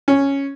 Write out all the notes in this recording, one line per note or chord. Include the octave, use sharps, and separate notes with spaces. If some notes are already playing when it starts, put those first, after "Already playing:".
C#4